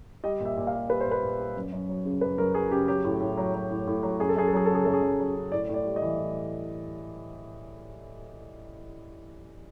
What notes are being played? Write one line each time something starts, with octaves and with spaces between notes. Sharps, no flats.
G3 D#5
A#2
E5
A#2
F5
G3
G3 B4
C5
A#2
B4
A#2
G3
F#2
F#2
F#3
C#3
F#2 B4
F#2 A#4
F#3 G#4
C#3 G4
F#3 G4
A2
A2
F#3
F#3
A2
A2
F#3
F#2 G#4
A4
F#2 G#4
A4
F#3 G#4
C#3 A4
G#4
F#2 A4
G#4
F#2
F#3
C#3
A2 D5
A2
D5
G3
D#5
E3
A2